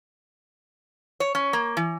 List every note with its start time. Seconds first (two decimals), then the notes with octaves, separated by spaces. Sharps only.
1.20 C#5
1.35 C#4
1.53 A#3
1.77 E3